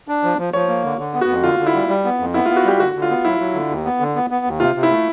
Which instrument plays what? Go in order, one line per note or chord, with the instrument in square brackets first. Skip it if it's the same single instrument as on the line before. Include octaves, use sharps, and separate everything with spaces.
[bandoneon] D4
F3
F3
[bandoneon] F3 [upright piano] C#5
[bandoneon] A#3
D3
D3
B3
[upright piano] F#4
[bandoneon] F2
[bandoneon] D3 [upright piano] F4
[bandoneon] D3
[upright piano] E4
[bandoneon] G3
G3
B3
F2
[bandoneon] B3 [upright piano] E4
[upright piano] F4
[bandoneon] B3
[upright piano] F#4
[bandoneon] G3 [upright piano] G4
[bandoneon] D3 [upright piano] F#4
[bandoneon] D3
[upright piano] F4
[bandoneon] B3
[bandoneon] F#3 [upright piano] E4
[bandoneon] F#3
D3
D#2
B3
D3
B3
B3
D#2
[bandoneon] C3 [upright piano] F4
[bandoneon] C3
[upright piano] E4
[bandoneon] A3